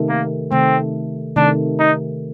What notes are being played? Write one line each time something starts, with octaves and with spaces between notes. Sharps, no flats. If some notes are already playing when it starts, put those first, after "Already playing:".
Already playing: C3 D#3 A3
A#3
C3 D#3 A3 C4
C3 D#3 A3 D4
D#4